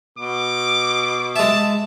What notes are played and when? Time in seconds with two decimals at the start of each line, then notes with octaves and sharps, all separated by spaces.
0.18 B2 D6
1.36 G#3 E5 A5